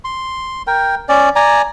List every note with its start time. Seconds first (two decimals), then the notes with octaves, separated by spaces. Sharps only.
0.05 C6
0.67 A#4 G5
1.09 C#4 D5
1.36 D5 G#5 A#5